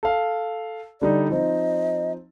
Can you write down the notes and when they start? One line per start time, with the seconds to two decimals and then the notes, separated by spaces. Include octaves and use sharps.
0.03 A4 F5
1.01 D3 G3 D#4 D5
1.30 F3 C4 D#4 D#5